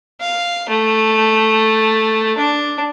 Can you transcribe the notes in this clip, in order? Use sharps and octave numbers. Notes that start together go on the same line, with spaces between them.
F5
A3
D4